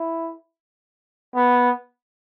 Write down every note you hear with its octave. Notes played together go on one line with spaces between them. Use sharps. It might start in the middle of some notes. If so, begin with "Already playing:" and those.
Already playing: E4
B3